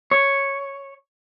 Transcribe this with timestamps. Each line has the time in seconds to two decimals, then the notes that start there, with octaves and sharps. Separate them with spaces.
0.11 C#5